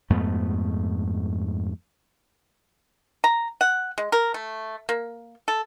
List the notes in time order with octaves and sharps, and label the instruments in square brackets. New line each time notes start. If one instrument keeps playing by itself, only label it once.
[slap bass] F2 G#2 A3 B3
[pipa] A#5
F#5
G#3
A#4
A3
A#3
A4